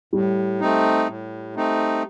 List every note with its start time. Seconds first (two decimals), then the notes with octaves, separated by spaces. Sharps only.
0.13 A2 G3
0.60 A3 C4 D#4
1.08 A2
1.56 A3 C4 D#4